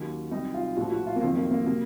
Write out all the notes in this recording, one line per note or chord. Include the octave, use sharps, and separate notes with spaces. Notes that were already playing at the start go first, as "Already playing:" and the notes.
Already playing: D#2 D#3 F#3 C#4
C2 C3 F#3 D#4
F4
A#1 A2 F3 F#4
F#4
F4
A#3
F2 D#3 F#3 C4
A#3
A#3
C3 F#3 A#3